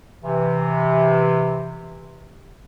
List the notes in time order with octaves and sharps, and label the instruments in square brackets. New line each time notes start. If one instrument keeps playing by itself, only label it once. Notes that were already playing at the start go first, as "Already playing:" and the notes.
[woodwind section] C3 E3